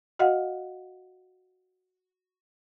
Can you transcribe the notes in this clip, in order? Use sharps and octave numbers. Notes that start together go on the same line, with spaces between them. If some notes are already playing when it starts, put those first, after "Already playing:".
F#4 D#5 F5 F#5